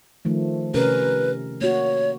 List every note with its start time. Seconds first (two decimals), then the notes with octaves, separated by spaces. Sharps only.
0.25 D#3 F3 A3
0.74 C3 C#4 A#4 B4
1.61 A#3 F#4 C#5